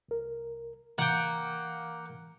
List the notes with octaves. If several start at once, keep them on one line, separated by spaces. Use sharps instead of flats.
C2 A#4
E3 A#3 F#5 G5